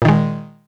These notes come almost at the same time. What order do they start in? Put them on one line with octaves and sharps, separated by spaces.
A#2 D#3 G#3